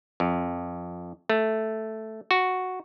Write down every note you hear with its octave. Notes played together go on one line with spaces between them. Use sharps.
F2
A3
F#4